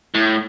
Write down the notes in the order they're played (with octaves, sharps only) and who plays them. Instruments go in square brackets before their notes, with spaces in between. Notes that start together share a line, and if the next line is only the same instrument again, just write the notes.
[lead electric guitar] A2